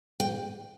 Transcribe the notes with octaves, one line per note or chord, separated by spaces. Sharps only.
G5